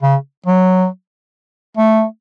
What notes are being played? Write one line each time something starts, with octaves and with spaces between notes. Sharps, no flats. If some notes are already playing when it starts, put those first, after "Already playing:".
C#3
F#3
A3